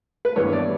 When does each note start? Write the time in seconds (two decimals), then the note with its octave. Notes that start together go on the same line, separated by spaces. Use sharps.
0.25 B4
0.36 G2 E3 G3 B3 C#5
0.53 D5